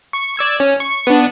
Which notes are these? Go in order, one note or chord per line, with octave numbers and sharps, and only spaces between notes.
C#6
D5 E6 G#6
C#4
C#6
B3 D4